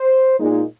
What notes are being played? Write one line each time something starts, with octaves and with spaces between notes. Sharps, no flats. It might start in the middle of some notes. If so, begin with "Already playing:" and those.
Already playing: C5
A#2 G#3 D#4